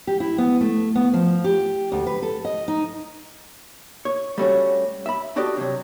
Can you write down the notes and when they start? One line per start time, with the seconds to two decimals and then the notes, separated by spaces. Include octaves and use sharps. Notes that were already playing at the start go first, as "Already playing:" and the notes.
0.07 G4
0.20 E4
0.38 B3
0.61 A3
0.95 B3
1.13 F3
1.44 G4
1.92 D2
2.06 B4
2.22 A4
2.45 D#5
2.68 D#4
4.05 C#5
4.38 G3 A3 C#4 F#4
5.06 E5 B5
5.36 D4 F#4 G4 A4 D5 D#5
5.57 C3 F#3